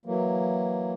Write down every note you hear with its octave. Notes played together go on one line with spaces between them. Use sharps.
E3 F#3 A#3